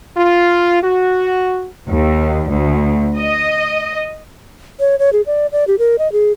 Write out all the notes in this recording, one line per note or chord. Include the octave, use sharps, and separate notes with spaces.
F4
F#4
D#2
D2
D#5
C#5
C#5
G#4
D5
D5
G4
A#4
D#5
G#4